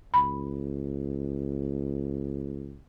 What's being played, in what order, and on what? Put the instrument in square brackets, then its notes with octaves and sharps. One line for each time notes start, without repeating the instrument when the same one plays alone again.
[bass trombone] C#2 [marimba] B5